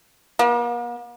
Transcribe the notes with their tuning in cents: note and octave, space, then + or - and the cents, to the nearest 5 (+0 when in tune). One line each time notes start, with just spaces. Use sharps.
A#3 +45